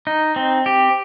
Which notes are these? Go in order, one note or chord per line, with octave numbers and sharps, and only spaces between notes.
D#4
C4
G4